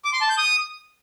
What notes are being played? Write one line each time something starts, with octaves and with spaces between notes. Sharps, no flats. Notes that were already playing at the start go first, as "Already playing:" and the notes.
D6
C6
A5
G6
D#6